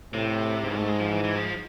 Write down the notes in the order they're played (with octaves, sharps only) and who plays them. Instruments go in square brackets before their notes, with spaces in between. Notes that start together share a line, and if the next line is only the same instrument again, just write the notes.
[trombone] A2 [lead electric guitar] C3
[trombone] G#2
[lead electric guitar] A3
G#3
F3
E3
E3
F3